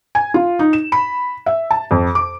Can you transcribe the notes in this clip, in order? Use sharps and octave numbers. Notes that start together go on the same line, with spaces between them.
G#5
F4
D#4
E7
B5
E5
A5
F2
D6